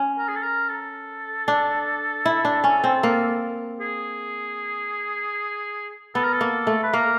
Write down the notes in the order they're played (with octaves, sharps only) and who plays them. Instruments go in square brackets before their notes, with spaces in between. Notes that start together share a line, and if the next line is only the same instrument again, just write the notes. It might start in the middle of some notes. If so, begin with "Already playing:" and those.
Already playing: [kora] C#4
[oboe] A#4
G#4
A4
A#4
A4
[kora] D4
E4
D4
C#4
C4
A#3
[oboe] G#4
[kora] B3 [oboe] A4
[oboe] A#4
A4
[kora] A#3
A3
[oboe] B4
[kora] A#3 [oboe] A#4